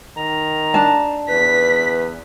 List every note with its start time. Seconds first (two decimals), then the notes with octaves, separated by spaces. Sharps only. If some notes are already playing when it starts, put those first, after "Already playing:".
0.17 D#3 A#5
0.74 D4 A5
1.29 E2 B4 B6